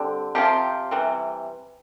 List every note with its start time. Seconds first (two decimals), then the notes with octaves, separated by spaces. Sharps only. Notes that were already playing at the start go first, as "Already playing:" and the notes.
Already playing: D3 G3 C4
0.35 C3 F3 C4 F4 G4
0.91 C3 E3 G3